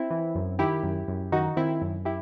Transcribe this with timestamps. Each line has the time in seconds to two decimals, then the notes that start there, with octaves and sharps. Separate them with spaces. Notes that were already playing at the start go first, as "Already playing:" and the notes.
Already playing: C4 E4
0.10 E3
0.35 F#2
0.59 D#3 E4 G4
0.83 F#2
1.08 F#2
1.32 D#3 D#4 F#4
1.57 D#3 C4 E4
1.81 F#2
2.05 E4 G4